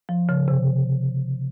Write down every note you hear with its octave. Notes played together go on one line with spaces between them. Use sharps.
F3
C#3
C3